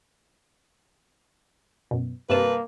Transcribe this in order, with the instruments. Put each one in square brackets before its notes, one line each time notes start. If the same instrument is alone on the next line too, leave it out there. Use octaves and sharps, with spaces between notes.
[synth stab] F#2 B2
[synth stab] G2 C3 A5 [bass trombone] A#3 [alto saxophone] B4